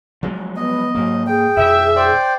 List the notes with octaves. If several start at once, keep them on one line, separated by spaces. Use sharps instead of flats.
F3 F#3 G#3
B3 D#5
G#2 F#3 A#3
G#4 G5
F2 B2 E5
C5 D5 G5